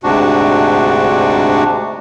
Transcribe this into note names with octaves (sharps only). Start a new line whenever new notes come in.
D2 G#2 C3 D4 F#4